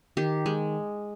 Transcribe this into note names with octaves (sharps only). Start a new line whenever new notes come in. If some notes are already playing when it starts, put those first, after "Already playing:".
D#3 G4
G#3